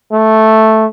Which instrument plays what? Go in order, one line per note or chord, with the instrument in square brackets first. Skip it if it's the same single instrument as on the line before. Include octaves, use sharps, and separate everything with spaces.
[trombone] A3